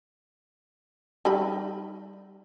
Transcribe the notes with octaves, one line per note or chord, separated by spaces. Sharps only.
G3 D#4 B5